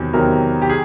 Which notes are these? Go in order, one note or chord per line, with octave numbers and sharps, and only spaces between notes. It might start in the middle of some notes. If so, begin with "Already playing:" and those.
Already playing: E2 C3 D#3 F#3
E2 C3 D#3 F#3 A#4
G4
G#4